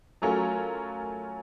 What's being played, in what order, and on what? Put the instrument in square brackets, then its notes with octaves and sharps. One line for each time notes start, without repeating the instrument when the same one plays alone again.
[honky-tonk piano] F#3 A3 C#4 F4 A#4